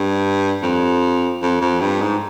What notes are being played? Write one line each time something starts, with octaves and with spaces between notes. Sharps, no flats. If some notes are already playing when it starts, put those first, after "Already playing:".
Already playing: G2
F2
F2
F2
G2
G#2